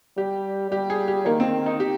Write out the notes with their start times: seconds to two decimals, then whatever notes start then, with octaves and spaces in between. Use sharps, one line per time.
0.17 G3 G4
0.72 G3 G4
0.90 G#4
1.08 G4
1.26 D#3 A#3
1.40 C4
1.66 D#4
1.80 G4